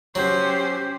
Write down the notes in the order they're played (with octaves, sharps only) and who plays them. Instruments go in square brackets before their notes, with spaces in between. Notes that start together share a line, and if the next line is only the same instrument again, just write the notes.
[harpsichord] F#3 [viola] C#4 C5 [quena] G4